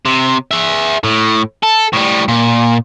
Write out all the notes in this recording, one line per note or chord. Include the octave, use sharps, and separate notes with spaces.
C3
G#4 E5
A2
A4
A2 G3
A#2